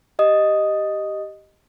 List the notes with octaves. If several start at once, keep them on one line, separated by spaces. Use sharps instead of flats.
G4 D#5 D#6